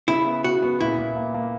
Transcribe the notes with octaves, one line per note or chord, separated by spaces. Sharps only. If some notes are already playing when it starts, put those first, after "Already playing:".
C#3 E4
B3
B3 F#4
B3
A#2 E4
A#2
A#3
A#3